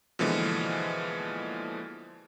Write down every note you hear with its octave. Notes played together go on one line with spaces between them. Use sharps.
B2 D3 E3 F3 G#3 A#3